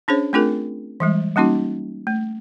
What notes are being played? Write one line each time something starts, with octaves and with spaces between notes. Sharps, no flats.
C#4 D4 G#4 C5 C#5
A3 C4 D4 F4 G#4 A#4
E3 G3 G#3
G3 A#3 C#4 D#4 F#4
A3